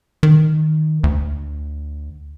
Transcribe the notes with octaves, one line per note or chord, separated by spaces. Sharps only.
D#3
D2